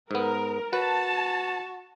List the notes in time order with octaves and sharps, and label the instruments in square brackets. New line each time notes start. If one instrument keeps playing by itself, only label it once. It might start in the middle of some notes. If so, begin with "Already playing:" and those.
[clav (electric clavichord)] G#2 B3 [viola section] A#4
[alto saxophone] F#4 [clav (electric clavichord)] B4 [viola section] A5